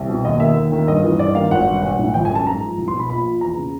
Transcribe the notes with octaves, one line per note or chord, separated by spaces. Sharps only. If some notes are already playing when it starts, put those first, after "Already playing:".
Already playing: C2
B2
D#2 D#5
D#3 E5
D#2
D#3
G2 D#5
E3
G2 D5
D#3 F5
G#1 F#5
G2
B1 F#5
A2
G1 G5
G#5
F#2
A5
G#2 A#5
F3
C2
C6
B2
B5
A#1 B5
A#2
E2 A#5
C#3